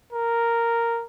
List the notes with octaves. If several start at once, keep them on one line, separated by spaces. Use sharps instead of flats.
A#4